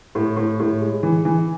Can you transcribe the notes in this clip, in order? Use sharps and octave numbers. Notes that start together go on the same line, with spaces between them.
A2
A2
A2
G#3
E3
E3